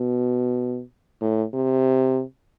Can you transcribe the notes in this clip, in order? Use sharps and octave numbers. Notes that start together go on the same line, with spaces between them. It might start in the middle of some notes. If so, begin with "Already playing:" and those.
Already playing: B2
A2
C3